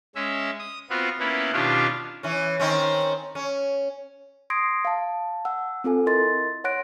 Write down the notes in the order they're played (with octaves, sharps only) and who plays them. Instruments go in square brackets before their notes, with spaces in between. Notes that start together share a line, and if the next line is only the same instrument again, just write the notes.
[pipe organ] G#3 C#4 E5
D#6
B3 C4 F4 F#4
A#3 B3 C#4 E4
B2 D#3 C#4 D4 F4 G4
[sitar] E3 C#4
D#3 C4 C#4
C#4
[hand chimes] C6 D#6 G#6 A#6 C7 D7
F5 A5
F#5 E6
C4 F4 A4 G#5
E4 A#4 D#5 C6 A6
C#5 F#5 C6 F#6 A#6 D7